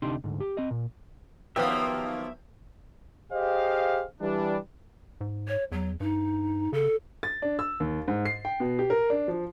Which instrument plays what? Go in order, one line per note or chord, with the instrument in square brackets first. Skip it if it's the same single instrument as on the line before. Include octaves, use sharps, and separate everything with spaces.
[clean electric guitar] D2 C3 D4 D#4 G4 C6
D2 G#2
G4
C4 D#5
A#2
[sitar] D#2 F3 A#3 [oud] F#3 B3 [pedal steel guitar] E5 [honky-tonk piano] F5 G5
[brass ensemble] G4 G#4 C5 D#5 F5
E3 G3 D4
[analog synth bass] G#2
[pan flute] C#5
[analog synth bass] E2 [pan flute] F#3
[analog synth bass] G2 [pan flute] D#4
[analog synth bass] C#3 [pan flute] A4
[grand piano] A6
D4
E6
D#2
G#2
C7
G5
B2
G4
A#4
D4
F3